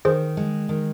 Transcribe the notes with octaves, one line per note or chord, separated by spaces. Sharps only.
D#3 G#4 C5
G#3
D#3